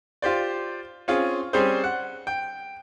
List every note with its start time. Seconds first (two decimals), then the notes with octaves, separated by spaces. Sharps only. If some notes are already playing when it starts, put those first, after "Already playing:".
0.22 F4 G4 C5 D5
1.08 C4 C#4 F4 G#4
1.53 G3 C4 C#4 G#4 C5
1.84 F#5
2.27 G5